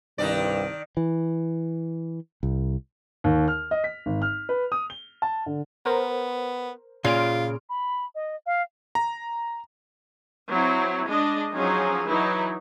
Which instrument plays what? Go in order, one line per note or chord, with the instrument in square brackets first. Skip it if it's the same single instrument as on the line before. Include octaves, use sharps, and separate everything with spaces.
[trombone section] C2 G2 [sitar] D#3 D4 D5
[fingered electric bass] E3
C2
[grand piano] D#2
F6
D#5
B6
G#1
F6
B4
D#6
G7
A5
D3
[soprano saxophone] B3 [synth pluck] A#4 C5
[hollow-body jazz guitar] A#2 C#3 [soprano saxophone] F4 [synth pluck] C6 F6 D7
[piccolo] B5
D#5
F5
[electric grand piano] A#5
[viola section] F#3 C4 E4
G#3 D4 D#5
F3 F#3 C#4 D#4 G#4
E3 F#3 D#4 E4